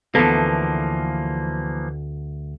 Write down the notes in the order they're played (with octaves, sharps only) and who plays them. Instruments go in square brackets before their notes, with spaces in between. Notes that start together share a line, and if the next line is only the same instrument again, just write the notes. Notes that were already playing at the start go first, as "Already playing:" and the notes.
[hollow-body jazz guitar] D2 B3 A4 [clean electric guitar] E3 F3 A#3